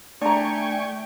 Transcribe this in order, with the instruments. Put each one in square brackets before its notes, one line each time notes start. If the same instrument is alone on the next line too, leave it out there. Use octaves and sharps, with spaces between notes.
[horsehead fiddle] A3 G5 [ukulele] D4 A#5 [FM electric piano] D5 [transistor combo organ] G#5 C#6